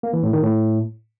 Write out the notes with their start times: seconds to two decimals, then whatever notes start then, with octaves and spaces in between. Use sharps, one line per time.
0.03 A#3
0.13 E3
0.23 A2
0.33 D#3
0.43 A2